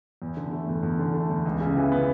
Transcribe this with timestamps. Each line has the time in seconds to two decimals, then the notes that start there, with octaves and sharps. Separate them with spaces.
0.22 E2
0.37 D3
0.53 A3
0.68 E2
0.83 E2
0.99 D3
1.14 A3
1.30 E2
1.45 C#2
1.60 C#3
1.76 E3
1.92 B3